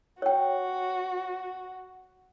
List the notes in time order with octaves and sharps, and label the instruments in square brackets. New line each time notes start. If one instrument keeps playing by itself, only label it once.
[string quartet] F#4 [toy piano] C#5 G5